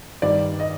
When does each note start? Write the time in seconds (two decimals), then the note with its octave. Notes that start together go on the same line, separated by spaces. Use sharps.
0.22 G2 D#3 G3 D5
0.59 D#5